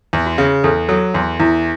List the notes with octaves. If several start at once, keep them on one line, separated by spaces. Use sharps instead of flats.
E2
F#4
C#3
E2 A4
F#3 A4
E2 F#4
E2 E4